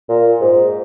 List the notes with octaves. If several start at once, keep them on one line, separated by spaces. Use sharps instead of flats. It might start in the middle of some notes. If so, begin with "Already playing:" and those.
A#2
G#2